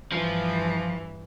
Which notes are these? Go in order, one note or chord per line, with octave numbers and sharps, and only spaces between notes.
G2 E3 F3